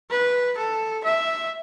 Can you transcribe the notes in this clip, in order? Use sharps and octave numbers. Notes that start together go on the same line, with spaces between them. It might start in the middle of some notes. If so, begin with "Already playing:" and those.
B4
A4
E5